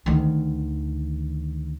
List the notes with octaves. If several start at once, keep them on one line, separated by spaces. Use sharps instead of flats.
D2 D#3